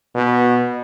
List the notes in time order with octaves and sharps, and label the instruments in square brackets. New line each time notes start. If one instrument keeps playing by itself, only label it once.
[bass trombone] B2